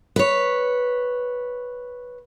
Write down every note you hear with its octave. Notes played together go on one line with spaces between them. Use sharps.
B4 C#5